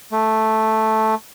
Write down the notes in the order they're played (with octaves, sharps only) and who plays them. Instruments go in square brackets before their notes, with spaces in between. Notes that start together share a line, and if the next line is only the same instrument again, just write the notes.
[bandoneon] A3